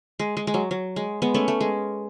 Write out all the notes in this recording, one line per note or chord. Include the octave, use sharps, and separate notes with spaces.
G#3
G#3
G#3
F#3
F#3
G#3
G#3 B3
A3 C#4
A3
G#3